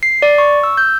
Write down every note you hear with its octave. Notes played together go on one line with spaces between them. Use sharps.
C7
D5
C#6
E6
G6